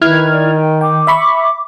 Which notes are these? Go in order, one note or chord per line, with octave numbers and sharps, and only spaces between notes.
D#3 E4 B4 F6 G#6
D5
G5
G5 D6
E5 B5 C#6